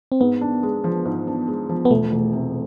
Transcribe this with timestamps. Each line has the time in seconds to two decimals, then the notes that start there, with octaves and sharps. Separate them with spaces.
0.12 C4
0.20 G#2 B3
0.41 D4
0.63 G#3
0.84 F3
1.05 G#2
1.27 D4
1.48 G#3
1.69 F3
1.85 B3
1.91 E1 A3
2.12 E1
2.33 C3